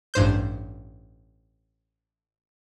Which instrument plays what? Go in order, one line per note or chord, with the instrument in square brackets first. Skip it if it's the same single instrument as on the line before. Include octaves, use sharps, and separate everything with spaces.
[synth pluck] A1 G2 C5 G6